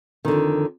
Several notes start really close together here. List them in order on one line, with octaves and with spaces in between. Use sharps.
D#3 D3 F2